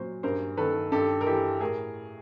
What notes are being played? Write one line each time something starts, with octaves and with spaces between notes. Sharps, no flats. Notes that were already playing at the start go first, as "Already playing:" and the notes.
Already playing: A#2 F#3 C5
G2 A#4 C5
D#3 A4 B4
G2 G4 A4
A#4
E3 G4 A4
A2 G#4 A#4